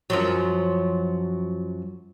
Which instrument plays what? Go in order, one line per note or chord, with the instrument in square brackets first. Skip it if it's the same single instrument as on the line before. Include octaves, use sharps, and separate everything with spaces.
[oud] F#2 F3 F#3